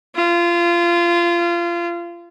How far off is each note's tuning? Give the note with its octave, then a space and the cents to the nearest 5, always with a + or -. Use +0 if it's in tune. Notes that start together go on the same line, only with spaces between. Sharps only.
F4 -25